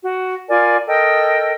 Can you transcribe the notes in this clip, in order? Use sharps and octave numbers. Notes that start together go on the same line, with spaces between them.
F#4
F4 A#4 D5 G#5
A4 A#4 D#5 G5